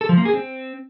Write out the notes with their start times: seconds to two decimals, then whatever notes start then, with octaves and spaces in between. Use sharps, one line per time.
0.01 A4
0.09 F3
0.17 A#3
0.25 G#4
0.34 C4